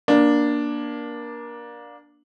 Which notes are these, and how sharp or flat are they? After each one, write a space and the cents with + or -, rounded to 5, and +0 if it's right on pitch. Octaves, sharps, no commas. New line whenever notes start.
A#3 +25 D4 +0